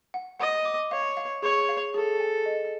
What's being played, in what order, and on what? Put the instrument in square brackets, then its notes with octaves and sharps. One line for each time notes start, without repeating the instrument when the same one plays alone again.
[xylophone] F#5
[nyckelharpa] D#5 [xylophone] F#5
[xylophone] D6
[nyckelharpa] C#5 [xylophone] F5
[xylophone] F5
[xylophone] G#4 [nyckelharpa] C#5
[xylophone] F5
[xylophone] G#4 [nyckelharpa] A4
[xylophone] G#5
D#5